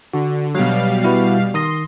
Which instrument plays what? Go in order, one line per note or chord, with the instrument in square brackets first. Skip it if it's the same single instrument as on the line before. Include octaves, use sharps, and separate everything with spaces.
[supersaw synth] D3 [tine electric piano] F#4
[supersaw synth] B2 G3 F5 [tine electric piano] F#3
[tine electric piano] E4 F#4 B4
[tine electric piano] D#3 D#6 A#6 [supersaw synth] C6